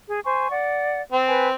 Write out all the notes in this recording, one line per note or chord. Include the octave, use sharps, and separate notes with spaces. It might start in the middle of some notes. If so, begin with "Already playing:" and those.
G#4
C5 G#5 C#6
D5 F#5
C4
B4 G#5